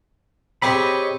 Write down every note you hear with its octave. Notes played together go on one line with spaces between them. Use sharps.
C4 G4 G#4 C#5 D#5 B5